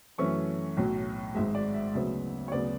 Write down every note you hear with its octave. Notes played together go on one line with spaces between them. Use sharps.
F#2 E3 A3 C#4 C#6
B1 A2 F#3
G#1 G#2 G#3 E5
D5
E5
D2 C#3 F#3 B3 E5
C#5
D2 C#3 F#3 B3 D5